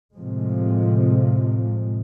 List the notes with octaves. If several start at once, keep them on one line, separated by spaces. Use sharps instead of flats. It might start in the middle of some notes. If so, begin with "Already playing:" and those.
A2 C3 F3 G#3